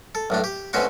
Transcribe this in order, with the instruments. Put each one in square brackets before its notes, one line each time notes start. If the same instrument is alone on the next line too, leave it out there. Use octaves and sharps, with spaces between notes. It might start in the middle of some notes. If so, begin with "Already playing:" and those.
[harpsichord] A4
B1 A2 D4
G4
A1 B2 C4 C#4 F#4 C6